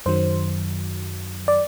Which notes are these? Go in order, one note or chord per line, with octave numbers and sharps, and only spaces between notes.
F#2 D#3 F#3 C5
D5